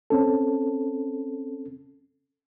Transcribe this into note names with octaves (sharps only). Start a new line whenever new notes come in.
C4 C#4 A4